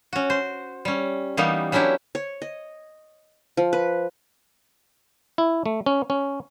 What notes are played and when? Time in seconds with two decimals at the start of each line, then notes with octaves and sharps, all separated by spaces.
0.13 C#4 F#4
0.30 C5
0.85 G3 C#4
1.37 E3 G3 A#3 B3 D#4
1.72 F#3 C#4 D4 E4 G4
2.15 C#5
2.42 D#5
3.57 F3
3.73 B4
5.38 E4
5.66 A3
5.86 C#4
6.10 C#4